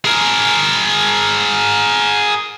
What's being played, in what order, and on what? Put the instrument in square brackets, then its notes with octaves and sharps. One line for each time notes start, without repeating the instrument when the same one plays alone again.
[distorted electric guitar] G#4 A#4